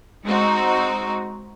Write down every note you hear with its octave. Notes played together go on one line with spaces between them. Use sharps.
G#3 C4 D#4 F#4